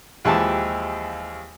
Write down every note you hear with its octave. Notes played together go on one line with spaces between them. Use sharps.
D#2 E3 F3 G#3 G4 A5